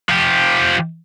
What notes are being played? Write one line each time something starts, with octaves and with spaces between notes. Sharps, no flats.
F3 G4